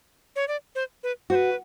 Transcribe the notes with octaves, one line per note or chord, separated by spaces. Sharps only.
C#5
D5
C5
B4
F#4 C5
B4